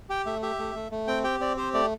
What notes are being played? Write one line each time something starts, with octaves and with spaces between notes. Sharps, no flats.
G4 G5
A3 E5
G4 E5
A3
A3
A3
C4 G5
G4 G5
C4 D5
G4 C5
A3 D5